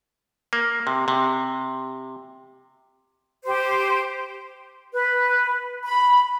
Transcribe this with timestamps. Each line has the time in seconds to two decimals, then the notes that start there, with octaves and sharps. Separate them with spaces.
0.53 A#3
0.87 C3
1.08 C3
3.45 G4 C5
4.92 B4
5.84 B5